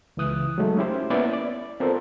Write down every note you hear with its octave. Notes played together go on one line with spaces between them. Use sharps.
C#2 C#3 E3 D#6 F#6
F#3 G#3 A3 D#4
C#4 E4 G4 C5
A#3 B3 C#4 E4 D5 E5
D5
B3 C4 F4 A4 A#4 C5